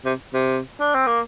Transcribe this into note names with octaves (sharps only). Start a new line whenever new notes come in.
C3
C3
D4
C4
A#3